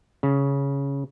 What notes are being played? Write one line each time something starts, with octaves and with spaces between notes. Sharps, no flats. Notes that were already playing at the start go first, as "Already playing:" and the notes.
C#3